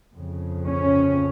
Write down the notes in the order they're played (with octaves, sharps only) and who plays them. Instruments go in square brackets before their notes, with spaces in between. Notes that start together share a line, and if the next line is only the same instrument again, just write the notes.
[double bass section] F2 C#3
C#4